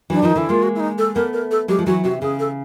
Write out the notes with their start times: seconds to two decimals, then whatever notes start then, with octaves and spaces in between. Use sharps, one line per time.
0.10 E3 F#3 D4
0.22 D#3 F3 D#4
0.35 D3 E3 E4
0.49 G#3 A#3 F4
0.63 F#4
0.76 E4
0.80 D#4
0.98 A4
1.15 A3 B3 A#4
1.33 A#4
1.51 A4
1.68 F#3 G#3 G4
1.79 F3
1.86 E3 F#3 F#4
2.04 C3 F#4
2.22 C#3 G#4
2.39 A4